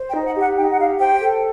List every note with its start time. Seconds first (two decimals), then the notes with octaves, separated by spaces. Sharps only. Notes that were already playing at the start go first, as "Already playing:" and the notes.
Already playing: C5
0.09 G5
0.14 D#4
0.25 F#5
0.35 G4
0.40 F#5
0.57 D#4 G5
0.72 F#5
0.78 G4 F5
0.99 C5 G5
1.20 A4